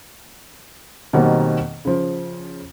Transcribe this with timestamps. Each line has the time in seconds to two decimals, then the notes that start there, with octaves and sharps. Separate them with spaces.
1.13 B2 D#3 F#3 G3 A#3 C4
1.85 C#3 F3